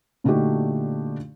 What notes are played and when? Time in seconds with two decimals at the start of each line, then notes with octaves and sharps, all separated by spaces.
0.24 A#2 D3 A3 D#4 F#4 G4